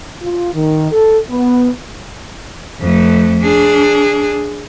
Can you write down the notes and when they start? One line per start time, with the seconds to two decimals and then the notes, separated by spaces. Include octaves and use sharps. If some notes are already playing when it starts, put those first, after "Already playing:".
0.22 F4
0.53 D#3
0.91 A4
1.30 B3
2.80 F2 A3
3.42 D4 G#4